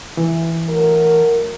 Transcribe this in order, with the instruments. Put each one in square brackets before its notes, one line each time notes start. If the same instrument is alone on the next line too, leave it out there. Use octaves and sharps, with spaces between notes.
[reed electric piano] E3
[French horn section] F#3 A3 A#4